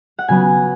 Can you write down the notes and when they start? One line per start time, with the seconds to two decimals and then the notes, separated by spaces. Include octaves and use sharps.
0.19 F#5
0.28 C#3 F#3 B3 G#5